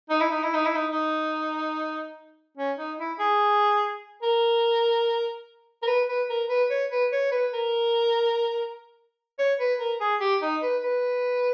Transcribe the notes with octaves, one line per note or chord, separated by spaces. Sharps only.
D#4
E4
D#4
E4
D#4
E4
D#4
D#4
C#4
D#4
E4
G#4
A#4
A#4
B4
B4
A#4
B4
C#5
B4
C#5
B4
A#4
C#5
B4
A#4
G#4
G4
D#4
B4
B4